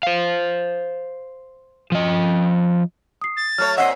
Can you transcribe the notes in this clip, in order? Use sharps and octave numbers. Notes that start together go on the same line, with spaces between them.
C5 F5
F3 D#5
D#6 C7
A6
F#3 A3 C#5 F6
A#2 C4 D#5 E5 F#5 E6 C7